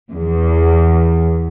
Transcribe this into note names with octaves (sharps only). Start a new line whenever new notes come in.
E2